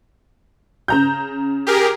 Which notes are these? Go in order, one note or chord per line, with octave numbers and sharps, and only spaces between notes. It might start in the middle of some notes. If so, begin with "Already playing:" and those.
C#3 A#5 G6
G4 G#4 A#4